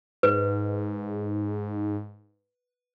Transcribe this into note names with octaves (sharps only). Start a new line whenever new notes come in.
G#2 B4